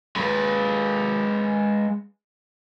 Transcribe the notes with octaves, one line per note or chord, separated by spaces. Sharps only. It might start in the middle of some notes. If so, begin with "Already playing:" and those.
G#3 B4